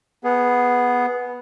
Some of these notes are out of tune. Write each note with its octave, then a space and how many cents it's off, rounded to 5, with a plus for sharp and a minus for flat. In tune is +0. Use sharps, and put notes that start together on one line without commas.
B3 -5 G#4 +0